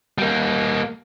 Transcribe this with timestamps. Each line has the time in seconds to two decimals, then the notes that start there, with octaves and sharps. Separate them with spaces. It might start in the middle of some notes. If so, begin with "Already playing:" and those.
0.18 G3 A#3